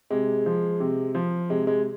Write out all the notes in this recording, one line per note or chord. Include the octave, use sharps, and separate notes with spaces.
C3 G#3
F3
C3
F3
C3 G#3
G#3